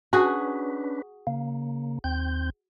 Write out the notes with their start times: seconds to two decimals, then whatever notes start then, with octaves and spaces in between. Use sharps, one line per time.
0.13 C#4 D4 F#4 G#4 B4
1.27 C#3 A#3
2.04 D#2 C4 G6